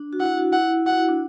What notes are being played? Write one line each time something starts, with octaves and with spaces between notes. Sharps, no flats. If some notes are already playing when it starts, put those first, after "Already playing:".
Already playing: D4
F#4
E4 F#5
F#4
E4 F#5
F#4 F#5
E4
D4